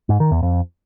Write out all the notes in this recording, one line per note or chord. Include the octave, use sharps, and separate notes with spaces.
G#2
D#3
E2
F2